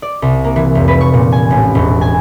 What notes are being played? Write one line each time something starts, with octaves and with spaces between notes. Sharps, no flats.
D5
C2
A#3
E3
F1
B4
C#6
A#2
G#5
A1
E1
G#5